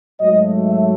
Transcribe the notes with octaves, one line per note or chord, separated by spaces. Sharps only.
G#2 F#3 A3 D#5
E5